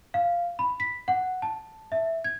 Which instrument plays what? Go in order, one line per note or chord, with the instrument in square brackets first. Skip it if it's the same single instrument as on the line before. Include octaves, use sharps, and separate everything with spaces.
[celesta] F5
B5
B6
F#5
A5
E5
G#6